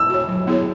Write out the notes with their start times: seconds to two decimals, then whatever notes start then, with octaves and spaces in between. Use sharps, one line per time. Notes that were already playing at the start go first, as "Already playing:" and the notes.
Already playing: E6
0.10 F#4 C#5
0.28 F#3
0.47 B3 E4 G#4 C#5